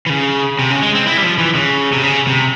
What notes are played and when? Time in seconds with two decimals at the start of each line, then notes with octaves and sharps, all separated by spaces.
0.06 E3
0.10 C#3
0.59 C3
0.70 C#3
0.83 G#3
0.95 C4
1.07 E4
1.17 G3
1.22 F3
1.38 E3
1.55 C#3
1.92 C3
2.03 C#3
2.27 C3